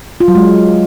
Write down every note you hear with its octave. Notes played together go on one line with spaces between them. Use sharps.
F4
F#3
G#3